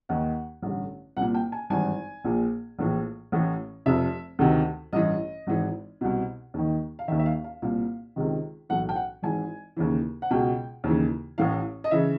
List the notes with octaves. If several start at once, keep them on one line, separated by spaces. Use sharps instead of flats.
D#2 D#3 F#5
A1 G2 D3
C2 A#2 F#5
G5
G#5
G#1 G2 E3 G#5
A#1 A#2
A#1 A2 E3
A1 A2 E3
F1 F2 C3 E5
D2 C3 D#3
A1 G2 E3 D#5
G#1 G#2 E3
C2 B2
D#2 D#3
F5
D#2 D#3 E5
E5
F5
F5
C2 A#2 F5
C#2 C3 D#3
B1 A2 E3 F#5
G5
F#5
G#1 G#2 E3 G#5
D#2 C#3 E3
F#5
C#2 B2 G5
D#2 C#3 E3
A1 A2 E3 F5
D#5
C#3 E3 E5